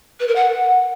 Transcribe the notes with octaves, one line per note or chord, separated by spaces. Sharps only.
B4
A#4
F#5